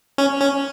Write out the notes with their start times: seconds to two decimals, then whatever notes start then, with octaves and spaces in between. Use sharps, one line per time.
0.18 C#4
0.40 C#4